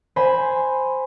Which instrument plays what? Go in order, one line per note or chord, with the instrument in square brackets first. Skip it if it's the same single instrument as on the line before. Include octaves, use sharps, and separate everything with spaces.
[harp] C5 G#5 B5